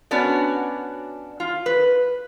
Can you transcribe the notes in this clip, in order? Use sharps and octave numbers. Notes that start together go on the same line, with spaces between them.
B3 C#4 D4 F#4 D5
F4
B4